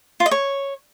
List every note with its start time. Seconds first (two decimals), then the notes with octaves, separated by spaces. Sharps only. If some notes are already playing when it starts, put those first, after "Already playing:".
0.20 F4
0.26 D#5
0.31 C#5